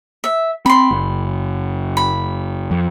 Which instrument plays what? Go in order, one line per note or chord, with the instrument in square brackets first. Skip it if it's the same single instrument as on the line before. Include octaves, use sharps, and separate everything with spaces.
[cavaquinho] E5
[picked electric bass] C4 [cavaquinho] B5 C6
[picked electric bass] F#1
[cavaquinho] B5
[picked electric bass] F2